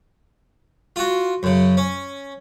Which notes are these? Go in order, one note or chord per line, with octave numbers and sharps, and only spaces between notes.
F4 F#4
F#2 C#3
C#4